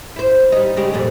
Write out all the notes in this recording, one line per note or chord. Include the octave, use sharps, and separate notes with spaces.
E4 C5
G3 D#4
C#3 G#3 G4
F2 A#2 G3